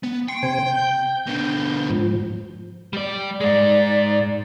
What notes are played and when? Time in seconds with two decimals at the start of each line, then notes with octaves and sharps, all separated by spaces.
0.04 B3
0.28 G5 C6 C#6
0.43 C3 C5 G#5
0.67 G6
1.27 B2 D3
1.90 G#2 F3
2.93 G3 D5
3.41 G#2 G#3 D5